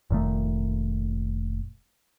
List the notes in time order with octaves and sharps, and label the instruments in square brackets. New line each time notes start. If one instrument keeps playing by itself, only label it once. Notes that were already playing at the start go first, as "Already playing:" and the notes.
[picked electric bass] F1 A#2 D#3 A3